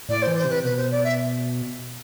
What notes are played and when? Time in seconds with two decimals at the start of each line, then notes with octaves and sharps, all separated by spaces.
0.09 A2 D5
0.22 C5
0.27 E3
0.36 C5
0.45 C3 B4
0.64 B2 B4
0.77 C5
0.91 D5
1.04 E5